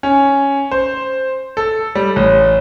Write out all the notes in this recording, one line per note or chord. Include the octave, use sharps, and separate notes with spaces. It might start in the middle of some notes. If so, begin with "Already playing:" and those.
C#4
C5
A4
G3
A1